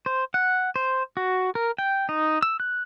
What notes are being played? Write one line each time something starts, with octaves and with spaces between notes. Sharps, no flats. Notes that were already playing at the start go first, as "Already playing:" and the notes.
C5
F#5
C5
F#4
A#4
G5
D#4
E6
F#6